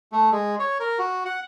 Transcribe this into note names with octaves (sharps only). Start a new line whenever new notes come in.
A3
G#3
C#5
A#4
F#4
F#5